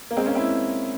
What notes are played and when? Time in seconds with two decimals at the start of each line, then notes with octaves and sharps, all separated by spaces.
0.11 A#3
0.17 G#3 C4
0.26 A#3 C#4
0.35 C4 E4